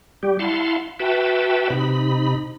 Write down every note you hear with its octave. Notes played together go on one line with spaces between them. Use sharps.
G3 G4
E4 F5 F#5 A5 C6
F#4 B4 E5 G5 A5
C3 D#4 B5